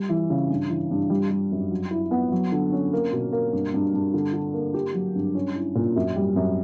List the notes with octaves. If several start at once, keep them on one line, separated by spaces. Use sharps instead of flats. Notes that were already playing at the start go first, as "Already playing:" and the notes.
Already playing: G3
E3
C#3
G2
E3
G2
G3
G3
F#2
F#3
E4
B3
F#3
D3
C#4
A#3
B2
A#3
G2
G2
G2
D3
D3
A#3
G4
F#3
G2
C#4
E4
A#2
F#2
G3
F#2